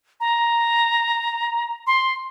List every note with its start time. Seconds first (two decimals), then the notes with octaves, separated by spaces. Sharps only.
0.20 A#5
1.87 C6